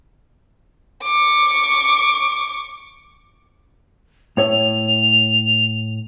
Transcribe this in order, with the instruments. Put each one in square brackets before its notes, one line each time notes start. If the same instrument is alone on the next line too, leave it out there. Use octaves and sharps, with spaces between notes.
[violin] C#6 D6
[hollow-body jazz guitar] A2 C#5 E5 [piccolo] F7